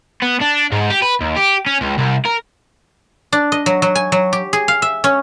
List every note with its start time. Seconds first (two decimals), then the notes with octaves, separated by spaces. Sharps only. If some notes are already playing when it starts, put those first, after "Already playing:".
0.22 B3
0.41 D4
0.72 G#2
0.90 G4
1.02 B4
1.21 D#2
1.37 G4
1.66 C#4
1.81 C#2
1.98 C2
2.25 A#4
3.33 D4
3.52 D#5
3.66 F#3
3.82 F#3
3.95 G#5
4.12 F#3
4.33 G4
4.53 G#4
4.68 F5
4.82 E5
5.04 C#4